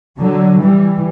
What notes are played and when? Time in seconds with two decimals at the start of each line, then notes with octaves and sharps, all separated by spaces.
0.18 D3 F#3
0.60 E3 G3